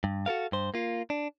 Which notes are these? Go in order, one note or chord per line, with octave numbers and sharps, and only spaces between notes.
G2
F#4 A4 A#4 F5
G2 C5
A#3 F4
D4